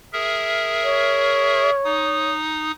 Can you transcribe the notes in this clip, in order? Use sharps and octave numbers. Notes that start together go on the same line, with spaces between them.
G#4 A#4 E5
C#5
D#4 D#6